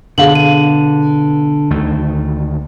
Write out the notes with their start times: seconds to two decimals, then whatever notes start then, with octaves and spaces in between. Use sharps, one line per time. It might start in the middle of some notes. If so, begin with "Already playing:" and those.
0.18 B2 D3 G#4 F5 F#7
0.35 D#7
1.71 D2 D#3 A3